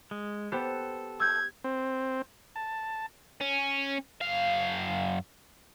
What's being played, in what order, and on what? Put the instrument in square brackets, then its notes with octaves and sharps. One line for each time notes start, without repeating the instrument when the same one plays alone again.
[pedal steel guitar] G#3
[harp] B3 G4 C5 [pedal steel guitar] A4
[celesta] E6 G6 [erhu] G#6
[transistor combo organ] C4
A5
[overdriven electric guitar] C#4
F#2 F5